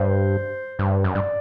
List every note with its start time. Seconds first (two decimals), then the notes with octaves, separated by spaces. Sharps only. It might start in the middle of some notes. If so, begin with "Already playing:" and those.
Already playing: G2 C5
0.79 G2
1.04 F#2
1.15 G2 D5